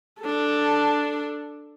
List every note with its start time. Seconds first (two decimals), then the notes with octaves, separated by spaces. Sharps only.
0.21 D4 A4